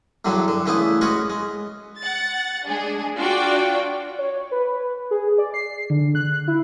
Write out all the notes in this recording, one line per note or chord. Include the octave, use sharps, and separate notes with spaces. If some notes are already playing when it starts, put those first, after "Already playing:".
E2 G2 D3 F#3
D3
C#3 E3 A3 B3 E4
G#3 B3 C#4 F#4 F#5
G#3
F#5 A6
G#3 D4 G#4
D4 F4 F#4 D5 G5
C#5
B4
G#4
D5
C7
D3
F#6
E4